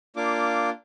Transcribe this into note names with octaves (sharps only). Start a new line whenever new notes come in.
A#3 D4 F4 D6